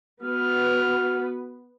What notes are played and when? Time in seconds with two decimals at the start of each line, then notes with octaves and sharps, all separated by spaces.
0.23 B3 F#4 B4 F6